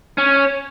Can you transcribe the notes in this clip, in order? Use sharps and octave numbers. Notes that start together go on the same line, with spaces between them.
C#4